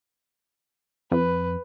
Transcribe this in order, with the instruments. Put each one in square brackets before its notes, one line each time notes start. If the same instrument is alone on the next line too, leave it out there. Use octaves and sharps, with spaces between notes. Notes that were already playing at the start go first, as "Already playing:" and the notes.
[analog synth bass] F2 [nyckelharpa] B4